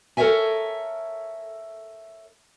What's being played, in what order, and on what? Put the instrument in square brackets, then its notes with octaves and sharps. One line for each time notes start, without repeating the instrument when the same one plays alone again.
[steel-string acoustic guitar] A4 A#4 C5 C#5 E5 G#5